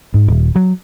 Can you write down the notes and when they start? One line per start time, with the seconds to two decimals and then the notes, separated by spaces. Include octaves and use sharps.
0.14 G#2
0.28 D#1
0.56 F#3